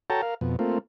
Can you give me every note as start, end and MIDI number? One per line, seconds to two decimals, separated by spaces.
0.10 0.21 66
0.10 0.21 69
0.10 0.21 73
0.10 0.21 79
0.10 0.21 81
0.10 0.21 82
0.22 0.34 70
0.22 0.34 77
0.41 0.56 41
0.41 0.56 47
0.59 0.78 57
0.59 0.78 58
0.59 0.78 60
0.59 0.78 65